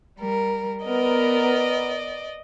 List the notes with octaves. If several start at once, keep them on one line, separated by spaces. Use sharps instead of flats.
G3 A#4
B3 A#4 D5 D#5